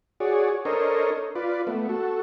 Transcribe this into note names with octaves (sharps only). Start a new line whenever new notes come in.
F#4 G#4 C#5 D5
D4 A4 A#4 C5 C#5 D#5
F4 B4 D5
A3 B3
F#4 A4